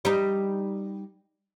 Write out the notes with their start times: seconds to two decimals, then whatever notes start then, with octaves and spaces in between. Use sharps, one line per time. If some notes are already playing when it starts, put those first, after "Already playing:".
0.05 G3 D#4